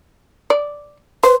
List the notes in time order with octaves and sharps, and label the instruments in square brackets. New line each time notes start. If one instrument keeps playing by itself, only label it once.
[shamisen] D5
[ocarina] B4 [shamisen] C5